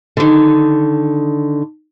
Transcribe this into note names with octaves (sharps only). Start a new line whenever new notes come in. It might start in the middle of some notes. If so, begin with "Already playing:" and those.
D3 D#3